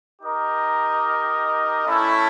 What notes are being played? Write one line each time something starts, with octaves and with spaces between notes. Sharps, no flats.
D#4 G4 A#4 D#5
A3 C#4 E4 A4